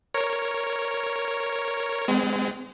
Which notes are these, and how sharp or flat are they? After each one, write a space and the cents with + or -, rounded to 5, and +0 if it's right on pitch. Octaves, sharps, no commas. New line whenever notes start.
A#4 +0 C#5 +0
G#3 -10 C4 -45